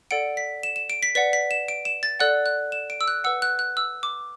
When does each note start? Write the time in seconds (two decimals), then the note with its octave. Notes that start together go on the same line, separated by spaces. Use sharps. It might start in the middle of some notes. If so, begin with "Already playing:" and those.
0.11 A4 D5 F#5 D7
0.37 B6
0.63 E7
0.76 E7
0.90 D7
1.03 B6
1.15 B4 D5 F#5 B6
1.33 B6
1.51 E7
1.68 D7
1.85 E7
2.03 A6
2.20 A4 D5 F#5 F#6
2.46 F#6
2.72 E7
2.90 D7
3.01 E6
3.08 F#6
3.24 B4 F#5 E6
3.42 F#6
3.59 F#6
3.77 E6
4.03 D6